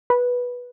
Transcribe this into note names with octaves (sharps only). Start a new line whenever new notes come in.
B4